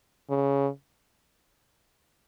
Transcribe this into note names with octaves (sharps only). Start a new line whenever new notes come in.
C#3